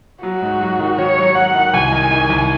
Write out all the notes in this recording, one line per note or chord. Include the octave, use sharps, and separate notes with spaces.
F#3 F#4
G#2
F#3
D#3
D#3 C#5
F#3
F#3 F#5
D#3
C2 G#5
D#3
D#3
C2